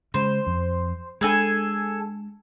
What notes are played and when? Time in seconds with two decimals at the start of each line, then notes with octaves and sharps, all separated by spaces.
0.14 C#3 G#3 C5
0.47 F2
1.21 G#3 D4 G#4 A4 G#5